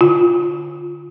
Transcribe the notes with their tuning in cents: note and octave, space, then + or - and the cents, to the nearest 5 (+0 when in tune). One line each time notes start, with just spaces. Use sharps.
D3 +0 F4 +0